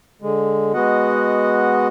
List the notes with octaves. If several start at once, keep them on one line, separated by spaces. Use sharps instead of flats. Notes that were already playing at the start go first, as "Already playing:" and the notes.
D3 G#3
G#3 B3 F#4 D#5 F#5